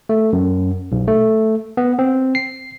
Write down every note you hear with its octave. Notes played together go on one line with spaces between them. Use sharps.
A3
F#2
B1
A3
B3
C4
C7